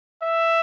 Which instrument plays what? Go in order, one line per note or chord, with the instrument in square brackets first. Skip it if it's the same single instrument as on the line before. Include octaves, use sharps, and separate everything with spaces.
[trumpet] E5